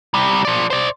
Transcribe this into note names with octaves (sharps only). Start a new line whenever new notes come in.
C3 G3
F3 D5
C5 D5